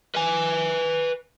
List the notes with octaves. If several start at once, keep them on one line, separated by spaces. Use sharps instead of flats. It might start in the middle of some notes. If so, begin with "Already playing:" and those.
B4 G#5